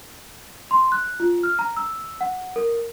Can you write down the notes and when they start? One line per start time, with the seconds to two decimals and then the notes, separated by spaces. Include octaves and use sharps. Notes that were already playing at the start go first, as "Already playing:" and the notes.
0.71 C6
0.92 F#6
1.20 F4
1.43 F6
1.59 A#5
1.77 E6
2.21 F#5
2.56 A#4